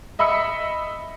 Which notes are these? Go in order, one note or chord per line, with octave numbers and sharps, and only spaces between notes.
D#5 E5 B5 E6 C#7